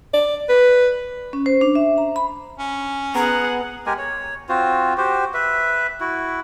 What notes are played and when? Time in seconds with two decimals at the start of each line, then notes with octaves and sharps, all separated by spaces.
0.14 D5
0.49 B4
1.33 C#4
1.46 C5
1.61 D4
1.75 E5
1.98 A#5
2.16 B5
2.59 C#4
3.15 B3 G#4 F#5 A#5
3.86 G#3 G4 A#4 G#5
3.98 C#5
4.49 C4 F4 F#4 C5
4.98 F#4 G4 C5
5.34 B4 E5
6.00 E4 F#4